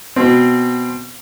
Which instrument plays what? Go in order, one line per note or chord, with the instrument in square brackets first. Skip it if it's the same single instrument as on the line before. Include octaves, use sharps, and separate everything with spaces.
[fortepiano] B2 C4